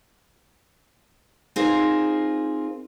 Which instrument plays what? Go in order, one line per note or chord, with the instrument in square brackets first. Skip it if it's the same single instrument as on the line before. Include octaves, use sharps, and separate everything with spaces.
[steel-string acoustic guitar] C4 D#4 F4 G#4 A#4 C5